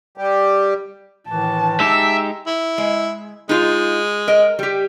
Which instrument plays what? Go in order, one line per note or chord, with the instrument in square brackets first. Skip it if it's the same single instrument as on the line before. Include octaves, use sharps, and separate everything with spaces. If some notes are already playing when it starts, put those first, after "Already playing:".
[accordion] G3 G4
[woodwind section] A2 D#3 E3 [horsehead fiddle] A5
[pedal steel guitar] G#3 D#4 G4 [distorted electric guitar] E5 [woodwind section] E6
[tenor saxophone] E4
[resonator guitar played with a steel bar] G#3
[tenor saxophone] G#3 [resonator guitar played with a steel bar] D#4 F4
[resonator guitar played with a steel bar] A#4 D#5
G3 G4